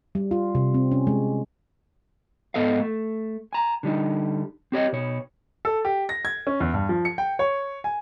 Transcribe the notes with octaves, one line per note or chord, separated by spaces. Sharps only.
G3
F4
C3
C4
C#4
G#3
G#2 B3 A4 D#5 F5
A3
G#5 A#5
D3 G3 D#4
C4 G4 C#5 D#5
B2 C#5
A4
G4
A#6
G#6
C#4
E2
G2
F3
C#7
G5
C#5
G#5